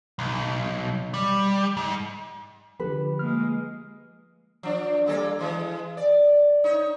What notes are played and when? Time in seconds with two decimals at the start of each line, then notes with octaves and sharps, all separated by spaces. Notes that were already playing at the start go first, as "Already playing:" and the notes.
0.19 B1
1.14 G3
1.77 G#2
2.80 D3 F3 G4 B4
3.19 G#3 A#3 F6
4.63 F3 D4
5.06 G3 A#3 A4
5.39 E3 G#3
5.97 D5
6.64 D#4 C#5